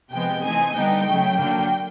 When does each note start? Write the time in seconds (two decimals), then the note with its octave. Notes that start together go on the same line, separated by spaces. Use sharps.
0.12 C3 F3 G#3 B3 G5
0.43 E3 A3 C4 D#4 G#5
0.75 D3 G3 B3 D#4 G5
1.06 C#3 F#3 A3
1.38 D3 F#3 A#3